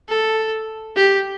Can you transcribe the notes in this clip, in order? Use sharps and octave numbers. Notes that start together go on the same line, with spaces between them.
A4
G4